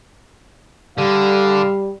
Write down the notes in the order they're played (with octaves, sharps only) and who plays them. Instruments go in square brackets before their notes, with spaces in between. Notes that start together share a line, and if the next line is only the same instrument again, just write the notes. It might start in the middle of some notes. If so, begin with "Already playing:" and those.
[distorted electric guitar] D3 [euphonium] G3 [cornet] F5